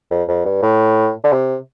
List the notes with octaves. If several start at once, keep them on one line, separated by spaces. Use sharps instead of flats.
F2
F2
G2
A2
D3
C3